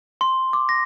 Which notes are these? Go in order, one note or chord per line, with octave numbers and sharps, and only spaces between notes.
C6
D6
A#6